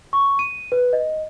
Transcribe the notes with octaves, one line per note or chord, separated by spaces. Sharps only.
C#6
D#7
B4
D#5